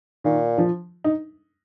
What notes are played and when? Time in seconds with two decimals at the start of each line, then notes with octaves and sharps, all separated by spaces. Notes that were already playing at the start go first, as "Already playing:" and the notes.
0.24 A#2 D#3
0.58 F3
1.04 D#4